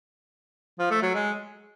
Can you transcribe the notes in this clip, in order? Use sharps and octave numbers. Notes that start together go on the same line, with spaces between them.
F3
A3
F#3
G#3